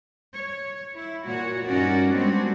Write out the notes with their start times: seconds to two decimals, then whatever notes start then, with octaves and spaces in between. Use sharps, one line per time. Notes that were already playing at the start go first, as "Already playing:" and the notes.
0.33 C#5
0.95 E4
1.25 A#2 F#4 C#5
1.66 G2 C#4 D#4 F#4 A#4 D5
2.13 G3 G#3 B3 C4 D4 F#4